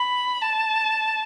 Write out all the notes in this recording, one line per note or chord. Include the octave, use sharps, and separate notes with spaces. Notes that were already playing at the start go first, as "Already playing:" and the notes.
Already playing: B5
A5